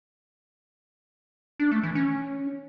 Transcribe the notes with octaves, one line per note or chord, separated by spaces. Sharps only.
D4
A3
E3
C#4